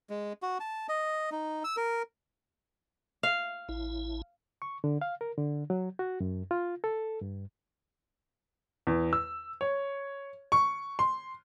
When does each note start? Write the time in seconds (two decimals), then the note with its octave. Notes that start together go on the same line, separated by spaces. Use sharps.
0.10 G#3
0.42 F#4
0.60 A5
0.89 D#5
1.32 D#4
1.64 E6
1.77 A#4
3.23 F5
3.69 A1 E4
4.62 C#6
4.84 D3
5.01 F5
5.21 A#4
5.38 D3
5.70 F#3
5.99 F#4
6.20 F#2
6.51 F4
6.84 A4
7.21 G2
8.87 E2
9.13 E6
9.61 C#5
10.52 C#6
10.99 C6